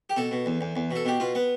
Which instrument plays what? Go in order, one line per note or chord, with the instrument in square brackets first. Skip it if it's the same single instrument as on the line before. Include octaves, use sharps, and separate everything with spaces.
[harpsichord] G4
B2 A4
B2
E2
E2
E2
B2 A4
B2 G4
B2 F4
B3